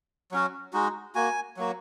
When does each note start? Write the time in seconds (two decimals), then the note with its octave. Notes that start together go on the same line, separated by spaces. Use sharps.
0.32 F#3 C#4 F#4
0.73 G#3 D#4 F#4
1.15 A#3 F#4 G#5
1.57 F#3 A#3 F#4